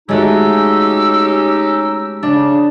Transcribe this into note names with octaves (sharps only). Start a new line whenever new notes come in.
G#3 A3 C#4 D#4 F#4 G4 E6
C#3 D4